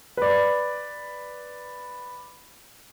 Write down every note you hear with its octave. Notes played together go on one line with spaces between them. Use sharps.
B4 D5